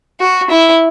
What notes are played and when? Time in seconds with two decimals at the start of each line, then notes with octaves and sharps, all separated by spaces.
0.20 F#4
0.50 E4